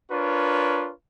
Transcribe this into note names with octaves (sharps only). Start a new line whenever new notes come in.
D4 F4 A#4 B4 C#5